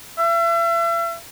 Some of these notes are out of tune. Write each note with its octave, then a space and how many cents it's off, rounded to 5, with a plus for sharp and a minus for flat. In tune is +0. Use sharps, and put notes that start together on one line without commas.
E5 +40